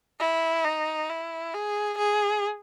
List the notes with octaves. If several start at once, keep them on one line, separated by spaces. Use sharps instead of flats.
E4
D#4
E4
G#4
G#4